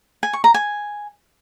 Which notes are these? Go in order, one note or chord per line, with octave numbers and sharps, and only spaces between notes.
G#5
C#6
A#5
G#5